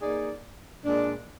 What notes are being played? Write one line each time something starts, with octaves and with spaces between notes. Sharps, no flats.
A#3 D#4 G#4 D5
A#2 G#3 D4